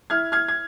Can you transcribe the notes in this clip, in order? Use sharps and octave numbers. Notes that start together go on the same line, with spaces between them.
E4 F6 G#6
F6 G#6
G#6